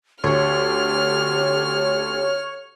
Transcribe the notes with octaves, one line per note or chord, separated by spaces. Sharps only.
D2 G4 C#5 F6